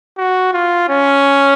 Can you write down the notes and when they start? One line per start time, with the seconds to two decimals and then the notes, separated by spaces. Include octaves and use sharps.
0.18 F#4
0.53 F4
0.89 C#4